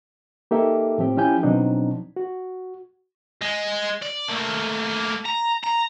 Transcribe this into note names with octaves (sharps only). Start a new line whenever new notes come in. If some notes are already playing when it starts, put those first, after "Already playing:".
A#3 D#4 G4 A4 E5
A2 F3 C4 G4
F3 C#4 E4 G4 G#5 G6
B2 F3 F#3 C4 D4 D#4
F#4
G#3
D5
A3 A#3
A#5
A#5